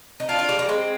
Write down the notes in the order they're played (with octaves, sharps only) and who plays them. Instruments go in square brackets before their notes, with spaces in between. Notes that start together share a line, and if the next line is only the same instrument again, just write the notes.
[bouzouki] D#4
[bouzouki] D4 F4 [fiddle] F5
[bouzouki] D4 F4
G3
G3 A#3
G#3 C4